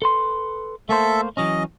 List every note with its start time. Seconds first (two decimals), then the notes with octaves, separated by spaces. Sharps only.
0.02 A4 B4 C6
0.89 A3 A#3 A4 C5 E5
1.37 E3 F#3 C#4 D#5